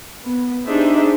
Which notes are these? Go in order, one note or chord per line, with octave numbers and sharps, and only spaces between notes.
B3
D4 D#4 G4 G#4 C5 E5